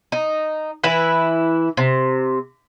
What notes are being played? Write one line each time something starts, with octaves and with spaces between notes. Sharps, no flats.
D#4
E3 E4 B4
C3